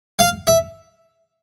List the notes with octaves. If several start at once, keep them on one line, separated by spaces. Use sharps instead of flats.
F5
E5